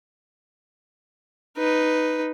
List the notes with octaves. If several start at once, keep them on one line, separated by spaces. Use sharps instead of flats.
D#4 B4